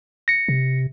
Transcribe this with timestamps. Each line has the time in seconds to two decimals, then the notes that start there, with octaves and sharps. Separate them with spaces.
0.28 A#6 C#7
0.48 C3